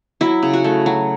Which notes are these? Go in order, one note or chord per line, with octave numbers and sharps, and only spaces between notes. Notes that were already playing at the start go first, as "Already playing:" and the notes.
F#3 E4
C#3
F#4
A3
F#3